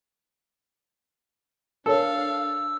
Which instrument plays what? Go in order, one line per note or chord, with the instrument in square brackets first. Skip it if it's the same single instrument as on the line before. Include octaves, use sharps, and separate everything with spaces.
[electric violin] D4 F5 [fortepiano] A4 [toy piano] A#4 C#5 [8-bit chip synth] E6